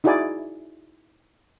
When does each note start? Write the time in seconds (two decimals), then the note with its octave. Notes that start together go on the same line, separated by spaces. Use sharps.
0.04 D#4 E4 F#4 G#4 D5 G#5